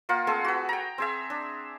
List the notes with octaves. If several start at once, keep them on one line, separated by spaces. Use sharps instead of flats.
A#3 F4 A#4 F#5
A3 C4 G#4 A4
F#4 B4
G5 A#5
C4 G#4 E5
D4